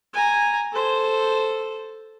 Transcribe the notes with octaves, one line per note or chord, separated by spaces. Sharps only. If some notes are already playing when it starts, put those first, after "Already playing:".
G#5 A#5
A4 C5